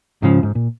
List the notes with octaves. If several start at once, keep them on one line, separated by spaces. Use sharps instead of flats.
C#2 G#2 C#3 F3
G#2
A#2